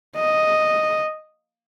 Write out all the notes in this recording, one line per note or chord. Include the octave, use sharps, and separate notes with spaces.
D#5